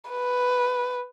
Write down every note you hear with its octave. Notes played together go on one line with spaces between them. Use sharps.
B4